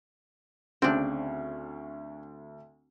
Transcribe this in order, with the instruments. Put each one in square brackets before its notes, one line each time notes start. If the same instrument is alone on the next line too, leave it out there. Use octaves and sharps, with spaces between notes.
[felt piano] D2 [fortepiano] C#3 [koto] C4 D4